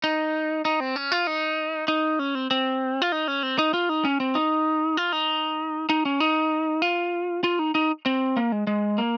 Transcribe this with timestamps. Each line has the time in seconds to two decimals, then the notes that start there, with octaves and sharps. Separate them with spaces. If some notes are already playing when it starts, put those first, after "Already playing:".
0.04 D#4
0.65 D#4
0.80 C4
0.96 C#4
1.12 F4
1.27 D#4
1.88 D#4
2.19 C#4
2.35 C4
2.51 C4
3.02 F4
3.12 D#4
3.28 C#4
3.43 C4
3.59 D#4
3.74 F4
3.89 D#4
4.05 C#4
4.20 C4
4.35 D#4
4.97 F4
5.12 D#4
5.90 D#4
6.05 C#4
6.20 D#4
6.82 F4
7.44 F4
7.59 D#4
7.75 D#4
8.06 C4
8.37 A#3
8.52 G#3
8.67 G#3
8.98 A#3